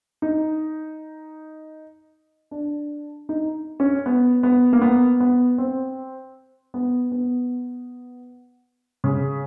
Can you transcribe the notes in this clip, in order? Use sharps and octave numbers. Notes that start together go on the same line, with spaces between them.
D#4
D4
D#4
C#4
B3
B3
A#3
B3
B3
C4
B3
B3
C#3